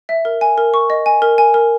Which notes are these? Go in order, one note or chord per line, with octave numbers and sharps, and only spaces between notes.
E5
A#4
G#5
A#4
C#6
D#5
G#5
A#4
G#5
A#4